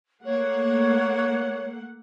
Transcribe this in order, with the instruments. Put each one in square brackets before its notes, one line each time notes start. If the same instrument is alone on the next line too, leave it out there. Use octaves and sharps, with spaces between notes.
[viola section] A3 A#3 F#5 [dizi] C#5